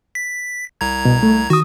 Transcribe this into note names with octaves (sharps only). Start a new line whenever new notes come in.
B6
C2 A#5 G#6
B2
A3
D#3 F#4 D#6